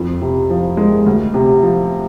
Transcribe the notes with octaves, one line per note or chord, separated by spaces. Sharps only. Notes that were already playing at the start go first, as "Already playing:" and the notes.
Already playing: F2
C3
F3
G#3
D2
C3
F3